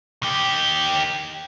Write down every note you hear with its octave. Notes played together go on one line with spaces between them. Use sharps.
D#3 G4